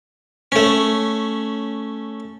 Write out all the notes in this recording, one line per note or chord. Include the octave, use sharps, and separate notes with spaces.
A3 C#4